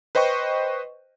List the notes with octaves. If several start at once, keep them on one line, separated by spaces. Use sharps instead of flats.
B4 C5 D#5 G5 C#6